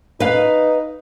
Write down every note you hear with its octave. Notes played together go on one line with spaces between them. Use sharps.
D#4 B4 F5